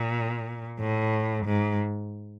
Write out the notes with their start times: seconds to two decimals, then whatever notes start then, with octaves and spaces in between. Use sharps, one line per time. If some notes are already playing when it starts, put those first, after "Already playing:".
Already playing: A#2
0.80 A2
1.46 G#2